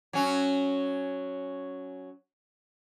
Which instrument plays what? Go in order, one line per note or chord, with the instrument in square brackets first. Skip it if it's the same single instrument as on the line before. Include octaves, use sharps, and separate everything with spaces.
[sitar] F#3 C#4